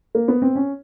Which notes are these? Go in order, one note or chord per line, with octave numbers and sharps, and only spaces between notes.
A#3
B3
C4
C#4